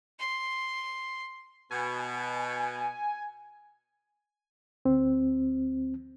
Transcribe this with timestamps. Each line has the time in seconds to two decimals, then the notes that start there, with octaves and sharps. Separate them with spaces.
0.19 C6
1.71 B2 G#5
4.85 D2 C4